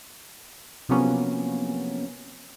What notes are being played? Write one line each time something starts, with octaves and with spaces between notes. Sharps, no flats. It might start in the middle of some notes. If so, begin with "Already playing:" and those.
C3 F3 F#3 A#3 B3 C#4